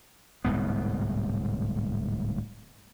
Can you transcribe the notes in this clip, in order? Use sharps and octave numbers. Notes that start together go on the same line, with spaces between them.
D1 C2 G#2 B3